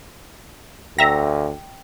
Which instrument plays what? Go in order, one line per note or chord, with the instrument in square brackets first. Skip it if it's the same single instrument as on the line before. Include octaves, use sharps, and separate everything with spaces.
[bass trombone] D2 [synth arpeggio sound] E5 A#5 A#6 [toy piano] G5